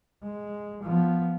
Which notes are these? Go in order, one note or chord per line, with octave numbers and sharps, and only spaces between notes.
G#3
F3 B3